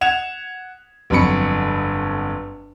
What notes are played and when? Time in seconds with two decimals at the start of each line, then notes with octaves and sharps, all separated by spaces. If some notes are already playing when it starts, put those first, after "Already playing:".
0.01 F#5 G#6 E7 F7
1.10 G1 F2 F#3 B5 C#7